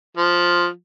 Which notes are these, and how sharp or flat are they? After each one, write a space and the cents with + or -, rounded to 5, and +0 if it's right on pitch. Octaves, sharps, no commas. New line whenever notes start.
F3 +5